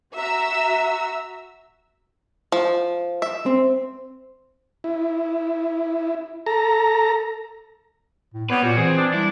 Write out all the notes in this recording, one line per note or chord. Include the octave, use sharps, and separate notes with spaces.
F#4 E5 A#5 E6
F3
E5
C4
E4
A4 A#5
A2
G3 B3 D4 B4 C#5
A#2 G3 F#4
E3 C4 G#4
D4
G3 E4